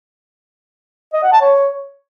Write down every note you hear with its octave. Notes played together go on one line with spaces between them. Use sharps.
D#5
F#5
A5
C#5